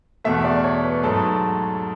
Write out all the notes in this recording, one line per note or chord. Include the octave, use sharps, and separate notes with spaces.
E2 B2 A3 E5
D5
C#5
B4
G#2 F#3 A3 A4